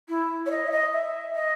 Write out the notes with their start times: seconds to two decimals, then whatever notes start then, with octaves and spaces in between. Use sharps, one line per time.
0.09 E4
0.46 C#5
0.51 D#5
0.67 E5
0.72 D#5
0.93 E5
1.35 D#5